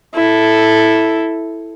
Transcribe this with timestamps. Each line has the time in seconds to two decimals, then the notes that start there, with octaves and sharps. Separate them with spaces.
0.15 E4 A4